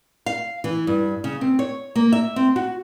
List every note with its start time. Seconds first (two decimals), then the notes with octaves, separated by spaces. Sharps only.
0.26 F5
0.64 E3
0.87 G2
1.24 C#3
1.41 C4
1.59 C#5
1.95 A#3
2.12 E5
2.36 C4
2.56 F#4